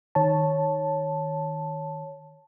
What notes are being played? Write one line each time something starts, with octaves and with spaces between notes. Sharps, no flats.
D#3 C#5 A5